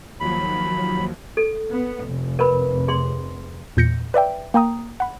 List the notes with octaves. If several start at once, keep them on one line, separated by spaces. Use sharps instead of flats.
D#2 F3 F#3 B5
A4
B3
F1
A#4 B4 B5
G#4 C6
E2 A#2 G6 A#6 C#7
B4 D5 E5 G5
A#3 G5 A#5 D#6
F#5 B5